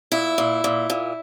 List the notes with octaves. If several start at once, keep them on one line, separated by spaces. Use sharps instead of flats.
A#2 E4
A#2
A#2
A#2